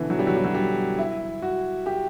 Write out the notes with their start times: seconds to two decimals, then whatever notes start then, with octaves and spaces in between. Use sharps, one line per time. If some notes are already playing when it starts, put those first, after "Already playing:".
Already playing: B2 D3 E3
0.10 F#3
0.19 G3
0.27 F#3
0.36 G3
0.45 F#3
0.54 G3
0.98 E4
1.42 F#4
1.86 G4